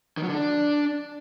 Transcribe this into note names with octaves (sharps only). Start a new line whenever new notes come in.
D#3
F#3
D3
D4